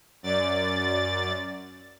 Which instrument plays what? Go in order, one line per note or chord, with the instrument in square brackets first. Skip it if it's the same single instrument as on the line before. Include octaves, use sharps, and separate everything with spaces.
[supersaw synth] F#2 D5 A6